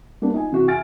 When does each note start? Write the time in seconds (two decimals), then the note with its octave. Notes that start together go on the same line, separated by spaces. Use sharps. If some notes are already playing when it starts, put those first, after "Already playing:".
0.22 G3 A#3 B3 D4
0.34 D#4 F4 G#5
0.51 C3 E3 F#4
0.68 E5 G#5 F6 A6 D7